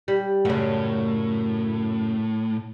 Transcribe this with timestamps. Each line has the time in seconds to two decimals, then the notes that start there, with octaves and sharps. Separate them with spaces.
0.08 G3
0.45 F#2 A2 C#3